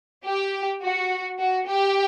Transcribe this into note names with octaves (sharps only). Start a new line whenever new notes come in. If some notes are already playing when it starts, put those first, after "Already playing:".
G4
F#4
F#4
G4